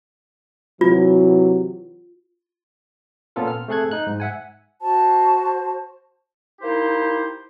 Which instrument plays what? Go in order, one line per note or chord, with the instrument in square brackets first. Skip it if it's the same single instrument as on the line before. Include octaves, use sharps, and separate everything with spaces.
[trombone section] C3 E3 F#3 [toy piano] F4
[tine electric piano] A#2 B3 C#4 F4 A4 A#4
F6
A3 C4 G#4 A4 F#6 G#6
D#4 F#6
G#2
E5 F#5 G#5
[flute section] F#4 C5 A5
[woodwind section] A#3 D#4 E4 G4 C5